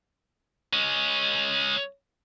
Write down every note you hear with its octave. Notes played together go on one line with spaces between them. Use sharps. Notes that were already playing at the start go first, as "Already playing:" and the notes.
G#3 C#4